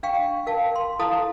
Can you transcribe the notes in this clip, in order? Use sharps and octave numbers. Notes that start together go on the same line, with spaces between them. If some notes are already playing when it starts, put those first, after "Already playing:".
D4 F5 G5 C#6
A#4 F5 A5
C6
E4 A4 F5 A5 A#5 D#6